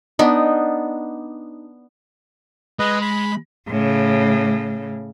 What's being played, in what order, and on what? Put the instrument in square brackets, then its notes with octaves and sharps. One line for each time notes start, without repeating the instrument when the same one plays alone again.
[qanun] B3 D4 D#4
[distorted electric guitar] G#3 [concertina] B4 D#5
[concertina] B5
[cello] A2 C#3